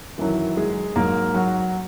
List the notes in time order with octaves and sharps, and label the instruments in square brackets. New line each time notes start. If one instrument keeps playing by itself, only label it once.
[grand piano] F#2 D#3 E3 F#3 E4
G#3 G#4
G#2 F#3 A#3 A#4
F#3 F#4